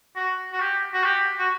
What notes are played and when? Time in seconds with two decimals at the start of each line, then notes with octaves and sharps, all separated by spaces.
0.16 F#4
0.52 F#4
0.60 G4
0.93 F#4
1.04 G4
1.39 F#4